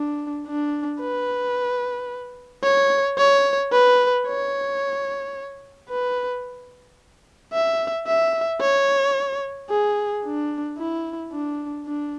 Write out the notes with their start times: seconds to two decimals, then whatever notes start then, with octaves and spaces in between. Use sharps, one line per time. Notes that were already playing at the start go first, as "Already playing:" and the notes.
Already playing: D4
0.47 D4
1.01 B4
2.63 C#5
3.18 C#5
3.72 B4
4.27 C#5
5.89 B4
7.53 E5
8.07 E5
8.61 C#5
9.70 G#4
10.24 D4
10.78 E4
11.32 D4
11.87 D4